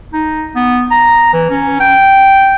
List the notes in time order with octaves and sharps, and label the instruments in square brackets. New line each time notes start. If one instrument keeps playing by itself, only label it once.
[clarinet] D#4
B3
A#5
E3
C#4
G5